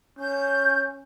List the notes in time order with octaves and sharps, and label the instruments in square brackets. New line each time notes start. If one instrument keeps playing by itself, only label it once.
[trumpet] C#4 [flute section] G6